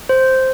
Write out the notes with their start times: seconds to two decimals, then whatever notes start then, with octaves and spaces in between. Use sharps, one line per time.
0.09 C5